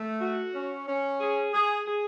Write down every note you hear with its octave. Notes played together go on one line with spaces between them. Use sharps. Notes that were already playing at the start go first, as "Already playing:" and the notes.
Already playing: A3
F#4
C#4
C#4
G#4
G#4
G#4